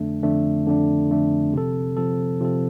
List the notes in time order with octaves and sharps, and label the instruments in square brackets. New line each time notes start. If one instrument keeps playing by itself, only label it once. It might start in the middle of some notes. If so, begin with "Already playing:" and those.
Already playing: [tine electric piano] F2 D3 A3 D4
F2 D3 A3 D4
F2 D3 A3 D4
F2 D3 A3 D4
C3 F3 C4 A4
C3 F3 C4 A4
C3 F3 C4 A4